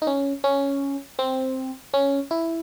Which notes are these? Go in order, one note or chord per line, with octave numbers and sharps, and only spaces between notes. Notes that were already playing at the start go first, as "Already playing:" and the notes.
D#4
C#4
C#4
C4
C#4
E4